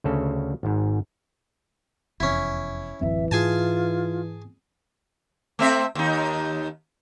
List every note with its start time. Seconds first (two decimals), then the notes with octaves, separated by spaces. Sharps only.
0.04 D2 C#3 A4
0.63 G#1 G#2
2.20 F1 E2 C#4 E4
3.01 D1 F#2 E3 C4 E5
3.31 G#2 F4 G#4 G#5 A5
5.59 A3 C4 E5
5.95 D#2 D#4